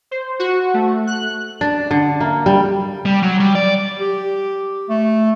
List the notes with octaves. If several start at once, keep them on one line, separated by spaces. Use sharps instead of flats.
C5
F#4
A3
F#6
D4
D3
A#3
G3
G3
F#3
G3
D5
G4
A3